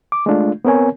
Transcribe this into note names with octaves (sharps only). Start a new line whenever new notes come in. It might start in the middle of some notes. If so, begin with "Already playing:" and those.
D6
G#3 A3 D4 F4
B3 C4 A#4 C#5 G#5